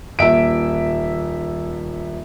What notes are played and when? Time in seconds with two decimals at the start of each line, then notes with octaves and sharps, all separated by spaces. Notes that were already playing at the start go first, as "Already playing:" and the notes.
0.19 D#1 E5 D7